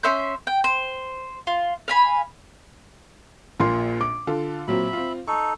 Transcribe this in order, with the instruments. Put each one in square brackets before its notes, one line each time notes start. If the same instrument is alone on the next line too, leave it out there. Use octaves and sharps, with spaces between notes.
[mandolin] C#4 E5 C6 G6
G5
C5
F4
F5 G#5 B5
[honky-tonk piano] A#1 [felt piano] A#2 C6
[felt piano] D6
[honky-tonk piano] D3 F4 A4
[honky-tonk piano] A#2 F#3 C4 [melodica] E5 B5
[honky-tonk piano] C4 F4
[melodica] D#4 A4 [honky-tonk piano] C#6